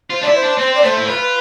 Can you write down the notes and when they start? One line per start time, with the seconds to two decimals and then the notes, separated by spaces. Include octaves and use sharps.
0.10 F4 C5
0.21 D4 E4 D5
0.35 C5
0.42 D4
0.58 C4 C5
0.74 D5
0.83 A3 C5
0.97 E4
1.07 F4 B4